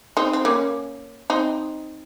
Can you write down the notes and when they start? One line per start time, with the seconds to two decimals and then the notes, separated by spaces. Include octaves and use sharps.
0.17 C4 D#4
0.33 C4
0.45 A#3 C#4
1.30 C4 D#4